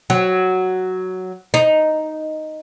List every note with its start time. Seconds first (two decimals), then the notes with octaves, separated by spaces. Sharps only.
0.10 F#3
1.54 D#4